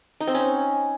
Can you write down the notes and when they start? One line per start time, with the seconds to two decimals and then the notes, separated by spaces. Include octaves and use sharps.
0.21 D#4
0.27 C4
0.34 C#4